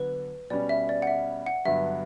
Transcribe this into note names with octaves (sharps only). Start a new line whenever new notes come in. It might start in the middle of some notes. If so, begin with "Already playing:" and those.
Already playing: D3 F#3 B3 B4
B2 G3 C#4 D5
E5
D5
F#5
E5
F#5
G2 D3 F#3 B3 E5